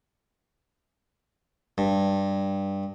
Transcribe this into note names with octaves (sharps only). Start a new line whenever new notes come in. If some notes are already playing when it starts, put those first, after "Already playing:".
G2